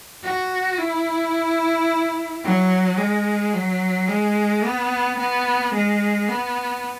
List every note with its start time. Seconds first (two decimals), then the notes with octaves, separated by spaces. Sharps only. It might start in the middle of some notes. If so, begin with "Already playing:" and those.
0.24 F#4
0.78 E4
2.44 F#3
2.98 G#3
3.53 F#3
4.08 G#3
4.63 B3
5.18 B3
5.74 G#3
6.29 B3